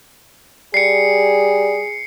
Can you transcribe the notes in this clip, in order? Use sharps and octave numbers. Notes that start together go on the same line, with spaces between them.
G3 G#4 C7 C#7